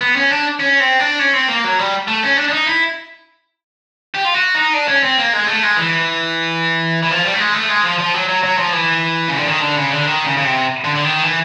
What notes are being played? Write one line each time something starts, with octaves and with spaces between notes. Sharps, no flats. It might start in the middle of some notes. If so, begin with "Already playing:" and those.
B3
C#4
D4
C#4
C4
D4
C#4
C4
A#3
F#3
G3
A3
C#4
D4
D4
D#4
E4
G4
F4
F#4
D#4
D4
C#4
C4
A#3
G#3
A3
G#3
E3
E3
F3
G3
A3
G#3
A3
G#3
F3
F3
F#3
F#3
F#3
F3
E3
C#3
D3
D#3
D3
C#3
D3
D#3
C#3
C#3
C3
D3
D3
D#3
E3